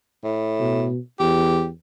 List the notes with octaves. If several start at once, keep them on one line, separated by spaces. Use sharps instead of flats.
A2
B2
E2 G4